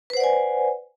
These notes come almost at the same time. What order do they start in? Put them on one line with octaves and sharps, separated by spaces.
B4 C5 F#5 D5 G#5